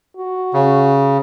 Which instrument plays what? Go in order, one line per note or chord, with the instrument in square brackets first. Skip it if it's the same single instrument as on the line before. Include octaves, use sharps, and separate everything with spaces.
[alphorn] F#4
[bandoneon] C#3